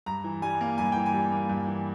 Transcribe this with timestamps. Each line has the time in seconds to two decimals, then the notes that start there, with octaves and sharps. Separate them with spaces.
0.06 G2 A#5
0.24 E3
0.42 G3 G#5
0.61 A#3
0.78 G2 G#5
0.92 E3 G5
1.06 G#5
1.13 G3
1.32 A#3
1.49 G2
1.67 E3